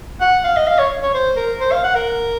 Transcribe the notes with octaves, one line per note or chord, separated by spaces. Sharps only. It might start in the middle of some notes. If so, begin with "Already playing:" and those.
F#5
F5
D#5
F5
C#5
C#5
C5
A#4
C5
F5
F#5
A#4